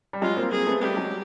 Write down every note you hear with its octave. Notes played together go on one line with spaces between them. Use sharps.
G3
F#3 G#3 F4
A#3 C4
A#3 C4 G#4
A3 B3
G3 A3 G4
F#3 G#3